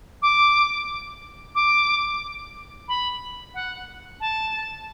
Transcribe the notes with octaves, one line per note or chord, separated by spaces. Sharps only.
D6
D6
B5
F#5
A5